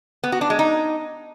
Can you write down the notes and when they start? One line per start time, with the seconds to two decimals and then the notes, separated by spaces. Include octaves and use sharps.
0.24 B3
0.32 F#4
0.41 D4
0.50 G#3
0.59 D#4